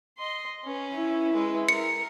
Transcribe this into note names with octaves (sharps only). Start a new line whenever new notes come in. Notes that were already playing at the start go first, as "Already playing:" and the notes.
D#5 C6
C#4 B4
E4
G#3 B4
A#4 C#7